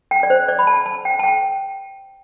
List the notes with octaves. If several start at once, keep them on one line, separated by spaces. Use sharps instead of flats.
G5
D5
C5
D5
B5
A5
A5
G5
A5
G5